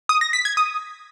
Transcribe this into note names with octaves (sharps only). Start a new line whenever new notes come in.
D#6
A#6
B6
G#6
D#6